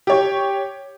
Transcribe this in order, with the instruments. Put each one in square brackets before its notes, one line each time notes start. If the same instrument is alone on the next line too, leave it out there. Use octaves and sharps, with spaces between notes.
[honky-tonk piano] G4 C#5